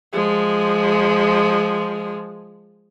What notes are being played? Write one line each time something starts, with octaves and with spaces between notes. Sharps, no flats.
F3 G#3